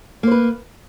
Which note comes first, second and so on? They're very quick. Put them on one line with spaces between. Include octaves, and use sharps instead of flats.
A#3 C5 B4